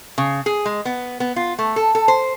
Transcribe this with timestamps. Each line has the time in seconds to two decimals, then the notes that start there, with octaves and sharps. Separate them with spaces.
0.18 C#3
0.46 G#4
0.66 G#3
0.85 B3
1.20 B3
1.36 F4
1.59 A3
1.76 A4
1.95 A4
2.08 C5